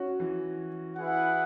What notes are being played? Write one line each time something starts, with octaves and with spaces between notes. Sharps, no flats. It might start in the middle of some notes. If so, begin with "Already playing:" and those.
Already playing: C#4 F#4
E3
E4 G#4 B4 F#5